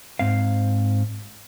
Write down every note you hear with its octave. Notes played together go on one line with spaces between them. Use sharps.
G#2 C4 F5